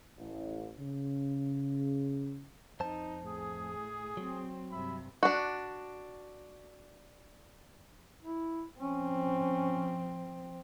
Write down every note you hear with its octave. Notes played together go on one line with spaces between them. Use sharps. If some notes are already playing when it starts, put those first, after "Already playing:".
A1
C#3
F2 D#4 C5 A5
A2 G#4
F#3 C4
G2 C3 E5 B5
D4 F#4
E4
F3 C4 C#4